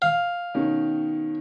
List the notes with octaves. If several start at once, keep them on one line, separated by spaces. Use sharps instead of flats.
F5
B2 D#3 C#4